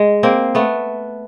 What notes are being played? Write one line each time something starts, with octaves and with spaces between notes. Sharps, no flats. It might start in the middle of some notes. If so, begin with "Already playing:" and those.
Already playing: G#3
A#3 C4
A3 B3